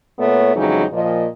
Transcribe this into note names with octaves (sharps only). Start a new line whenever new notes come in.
A#2 A3 B3 C#5
F2 C#3 E3 F#3 G#3 D#4
A#2 F3 D#5